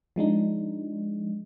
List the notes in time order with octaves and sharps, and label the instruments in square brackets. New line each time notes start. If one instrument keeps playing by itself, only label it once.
[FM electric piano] F3 G#3 D4 D#4